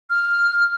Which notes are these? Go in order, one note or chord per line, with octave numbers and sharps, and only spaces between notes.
F6